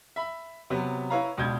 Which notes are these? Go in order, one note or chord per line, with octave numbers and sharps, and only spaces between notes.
E5 B5
C3 F#3 B3
E4 B4 C#5 F5 A#5
C#2 B2 D4 G6 G#6